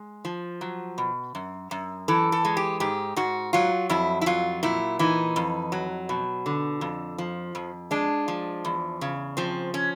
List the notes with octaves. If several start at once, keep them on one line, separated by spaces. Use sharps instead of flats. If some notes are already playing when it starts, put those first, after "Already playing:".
Already playing: G#3
F3
F#3
B2
F#2
F#2
E3 A4
A4
G#3
G4
G#2 G4
G#2 F#4
F#3 F4
F2 E4
E4
F#3 F4
A#2 E4
E3 D#4
F2
F#3
B2
D3
F2
F3
F2
G#3 D4
F3
E2
C#3
F3 C4
C#4